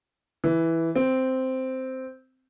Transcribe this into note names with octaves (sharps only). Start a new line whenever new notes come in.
E3
C4